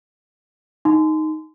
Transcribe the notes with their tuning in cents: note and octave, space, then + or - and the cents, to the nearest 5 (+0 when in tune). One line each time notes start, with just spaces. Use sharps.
D#4 +0 C6 -30